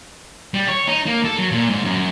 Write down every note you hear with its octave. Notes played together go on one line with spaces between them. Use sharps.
G3
C#5
D#4
A#3
A4
F#3
A#2
G#2
F#2